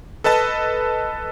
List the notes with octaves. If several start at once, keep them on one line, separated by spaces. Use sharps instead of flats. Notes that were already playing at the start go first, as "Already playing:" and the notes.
A4 B4 D#5 A5